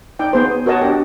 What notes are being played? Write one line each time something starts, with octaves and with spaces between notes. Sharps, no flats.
D#4 D5 G5
B3 G#4 C5
G#4
F#4 A#4 C#5 D#5 A5
D4 G4